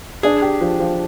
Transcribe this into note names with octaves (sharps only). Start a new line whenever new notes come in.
D4 G#4
G4
F3
F3